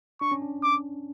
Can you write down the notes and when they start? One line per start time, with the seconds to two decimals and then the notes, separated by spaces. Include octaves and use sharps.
0.21 D4 C#6
0.32 C#4
0.42 D4
0.63 D6